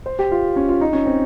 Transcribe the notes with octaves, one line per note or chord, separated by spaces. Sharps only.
C5
G4
F4
C#4
F4
D#4
C#4
C4